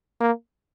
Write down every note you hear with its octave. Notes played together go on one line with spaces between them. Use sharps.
A#3